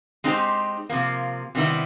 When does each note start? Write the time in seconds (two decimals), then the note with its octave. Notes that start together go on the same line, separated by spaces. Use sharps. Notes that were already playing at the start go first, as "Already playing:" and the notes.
0.24 G#3 C4 D#4 G4 C5
0.89 C3 F3 A#3
1.55 C3 D#3 G3 B3 E4